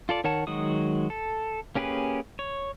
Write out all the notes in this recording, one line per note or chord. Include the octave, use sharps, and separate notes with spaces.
F4 A4 D5
D#3 A#4 C#5 F#5 A5
D#3 F#3 G#3 F#4 D#6
A4
A#3 C#4 G4 G#4 B4
C#5